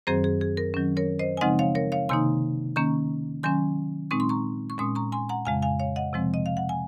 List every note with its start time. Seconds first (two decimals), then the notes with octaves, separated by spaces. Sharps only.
0.07 F#2 D#3 F#3 C4 G#4 C5
0.24 G#4
0.41 G#4
0.57 A#4
0.74 D#3 F#3 C#4
0.97 A#4 C#5
1.19 C5 D#5
1.37 G#5
1.41 C#3 F3 G#3 C4 D#4 D#5 F#5
1.59 C#5 F5
1.75 A#4 C#5
1.92 C#5 F5
2.09 C3 D#3 A#3 D#4 G#5 C6
2.76 D#3 A#3 C#4 A#5 C#6
3.43 D#3 F#3 C#4 G#5 C6
4.11 A#2 G#3 C4 D#4 C#6
4.20 C6
4.29 A#5 C#6
4.70 C#6
4.78 A#2 G#3 C#4 C6 D#6
4.95 A#5 C#6
5.12 G#5 C6
5.29 F#5 A#5
5.45 F2 C#3 G#3 F5 G#5
5.62 F5 G#5
5.79 C#5 F5
5.96 D#5 F#5
6.13 C3 F3 G#3 C4
6.34 D#5
6.46 F5
6.57 F#5
6.69 G#5